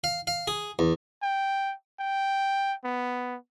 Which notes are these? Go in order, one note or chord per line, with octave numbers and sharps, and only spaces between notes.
F5
F5
G#4
E2
G5
G5
B3